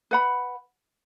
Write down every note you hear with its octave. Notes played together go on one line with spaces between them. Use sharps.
B4 F#5 B5